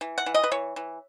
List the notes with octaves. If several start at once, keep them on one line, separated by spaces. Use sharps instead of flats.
E3
F#5
E3
D#5
B4
E3 C#5
E3